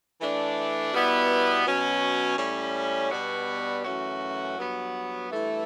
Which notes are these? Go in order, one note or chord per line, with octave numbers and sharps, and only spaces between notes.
E3 A3 D4
B2 G3 B3 E4
B2 F#3 C#4
A2 G3 C#4
B2 G3 B3 D4 F#4
F#2 E3 A3 C#4 F#4
G2 F#3 B3
G2 E3 A3 E4